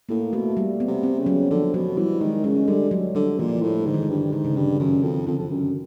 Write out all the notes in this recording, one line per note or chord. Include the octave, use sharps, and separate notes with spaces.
A2 A#3
B2 A3
G3
B3
C3
C4
C#3
F#3
D3 F3
B2 F#3
E3 G3
D#3 G#3
C#3 G#3
D3 G3
F#3
D3 G3
A#2 E3
F3
A2 E3
G#2 D3
D#3
D3
G2
G#2 D3
C#3
G2 D3
F#2 D#3
F2
F2 D3
F2
F#2